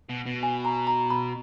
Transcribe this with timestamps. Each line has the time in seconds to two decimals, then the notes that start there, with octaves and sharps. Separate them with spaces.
0.09 B2
0.26 B2
0.43 G#5
0.65 A#5
0.87 A#5
1.10 B5